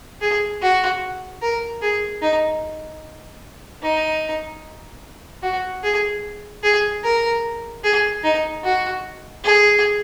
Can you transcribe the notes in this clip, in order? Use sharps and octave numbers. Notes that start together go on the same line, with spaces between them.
G#4
F#4
A#4
G#4
D#4
D#4
F#4
G#4
G#4
A#4
G#4
D#4
F#4
G#4